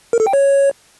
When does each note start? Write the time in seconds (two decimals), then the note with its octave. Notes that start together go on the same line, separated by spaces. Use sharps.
0.13 A#4
0.20 A4
0.27 G5
0.33 C#5